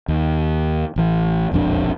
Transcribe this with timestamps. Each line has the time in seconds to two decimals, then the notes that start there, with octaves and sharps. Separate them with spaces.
0.08 D#2
0.96 A1 E3
1.51 E1 A#1 F2 D4